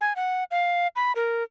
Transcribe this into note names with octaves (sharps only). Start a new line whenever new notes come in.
G#5
F#5
F5
B5
A#4